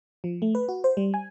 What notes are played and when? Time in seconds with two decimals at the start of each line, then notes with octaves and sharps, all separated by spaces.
0.24 F3
0.42 A3
0.55 B4
0.69 F#4
0.84 C5
0.97 G3
1.14 G#5